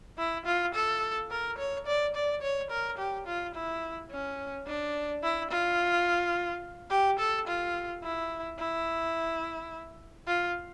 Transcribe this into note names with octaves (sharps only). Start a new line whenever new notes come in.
E4
F4
A4
A#4
C#5
D5
D5
C#5
A#4
G4
F4
E4
C#4
D4
E4
F4
G4
A4
F4
E4
E4
F4